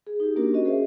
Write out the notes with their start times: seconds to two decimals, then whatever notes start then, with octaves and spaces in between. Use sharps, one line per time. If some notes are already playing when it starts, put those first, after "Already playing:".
0.07 G#4
0.20 D#4 G4
0.36 A#3 C#4 D4 F#4 G4 A#4
0.53 C#4 F#4 D#5
0.65 G#4 C5 D#5 E5